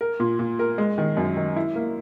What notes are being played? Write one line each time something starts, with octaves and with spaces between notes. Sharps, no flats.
A#4
A#2
A#2
A#4
G#3
D#3
F#2
D#3
E4
A#3